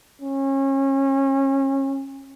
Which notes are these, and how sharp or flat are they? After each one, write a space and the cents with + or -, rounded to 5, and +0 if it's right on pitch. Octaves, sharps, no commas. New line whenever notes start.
C#4 -30